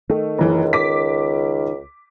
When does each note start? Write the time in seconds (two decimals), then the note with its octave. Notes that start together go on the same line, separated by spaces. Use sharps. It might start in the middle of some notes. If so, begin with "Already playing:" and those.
0.10 D#3 A3
0.38 F#1 C#2 E3
0.73 D6 B6